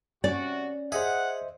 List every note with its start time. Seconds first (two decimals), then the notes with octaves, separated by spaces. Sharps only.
0.24 C3 C#4 F#4 D5
0.92 G#4 C5 D#5 E5 F#5